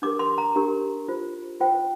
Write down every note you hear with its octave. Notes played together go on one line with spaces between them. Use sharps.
D4 G4 A#4 D6
C6
A#5
D4 G4 A#4
F4 C5
F4 C5 G5